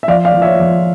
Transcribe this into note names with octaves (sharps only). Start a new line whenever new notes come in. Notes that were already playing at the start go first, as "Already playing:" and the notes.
E5
F3 D5 F5
D5 F5
F3
C#5 E5
F3